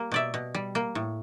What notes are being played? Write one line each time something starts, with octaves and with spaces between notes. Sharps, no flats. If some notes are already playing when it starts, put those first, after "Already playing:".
Already playing: G3 A#3
B2 D5 E5
B2
G3
A#3
A2